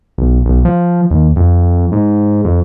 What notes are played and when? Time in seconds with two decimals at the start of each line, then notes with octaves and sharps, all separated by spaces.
0.18 B1
0.45 B1
0.65 F3
1.11 D#2
1.36 F2
1.92 G#2
2.44 F2